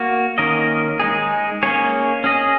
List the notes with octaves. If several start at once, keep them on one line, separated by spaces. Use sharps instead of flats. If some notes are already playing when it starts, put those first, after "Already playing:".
Already playing: A#3 F#4
D#3 A#3 C#4 A#4 D#5
G#3 D#4 G#4
A#3 C#4 G#4 C#5
C#4 G#4 D#5